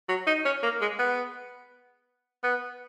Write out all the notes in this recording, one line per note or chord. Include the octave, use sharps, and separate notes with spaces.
F#3
D#4
C#4
A#3
G#3
B3
B3